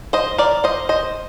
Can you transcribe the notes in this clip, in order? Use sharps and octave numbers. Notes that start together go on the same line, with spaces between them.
C5 D#5
A#4 D5
C5 D#5
C5 D#5